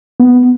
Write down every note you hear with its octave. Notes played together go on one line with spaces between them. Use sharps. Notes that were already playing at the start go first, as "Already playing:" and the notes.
B3